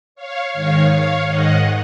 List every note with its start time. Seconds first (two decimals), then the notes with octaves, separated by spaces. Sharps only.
0.15 C#5 F5
0.53 G#2 D#3 C#5 F5
0.89 C#5 F5
1.26 G#2 D#3 D#5 F#5